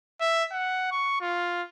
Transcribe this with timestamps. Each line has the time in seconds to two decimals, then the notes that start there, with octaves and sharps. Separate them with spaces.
0.21 E5
0.52 F#5
0.91 C#6
1.21 F4